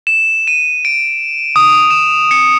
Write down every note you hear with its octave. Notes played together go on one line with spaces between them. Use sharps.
E7
D#7
D7
D#6
E7
C#7